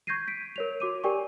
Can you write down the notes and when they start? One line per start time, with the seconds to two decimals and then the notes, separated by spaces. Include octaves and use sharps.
0.07 C#6 G6 G#6 A#6 C7 D#7
0.28 B6 D7
0.56 A#4 C#5 F7
0.80 F#4 D6 D#7
1.04 G4 A#4 D5 G5 G#5 C#6